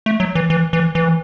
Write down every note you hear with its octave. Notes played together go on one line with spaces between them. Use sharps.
A3
F#3
E3
E3
E3
E3